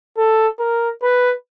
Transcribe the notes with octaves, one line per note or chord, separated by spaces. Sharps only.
A4
A#4
B4